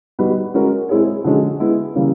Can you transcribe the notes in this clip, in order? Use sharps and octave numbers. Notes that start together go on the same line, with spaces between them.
G3 B3 D#4 F#4 B4
G#3 C#4 F#4 A#4
G#3 C4 E4 G#4 C#5
D3 F3 G#3 C#4 F#4
G#3 B3 E4
C#3 E3 G3 A#3 C#4